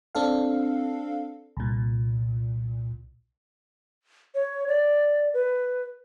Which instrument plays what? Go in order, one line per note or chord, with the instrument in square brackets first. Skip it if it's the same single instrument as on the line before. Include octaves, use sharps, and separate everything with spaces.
[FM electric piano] C4 D4 A4 F5
C2 A#2
[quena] C#5
D5
B4